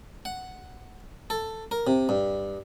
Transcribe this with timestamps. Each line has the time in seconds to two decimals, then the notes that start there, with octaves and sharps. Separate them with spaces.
0.25 F#5
1.30 A4
1.71 A#4
1.87 C3
2.09 G2